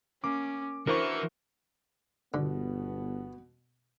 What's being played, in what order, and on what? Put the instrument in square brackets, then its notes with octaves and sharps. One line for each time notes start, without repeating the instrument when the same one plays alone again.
[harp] A#3 [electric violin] C#4 [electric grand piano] D6
[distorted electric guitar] E3 [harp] D4 E4 F#4 [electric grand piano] A#4 C5 C#6 [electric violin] C#7
[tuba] G1 [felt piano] B2 [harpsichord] D3 [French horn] B3